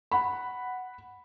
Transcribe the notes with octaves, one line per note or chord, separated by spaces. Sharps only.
F#5 B5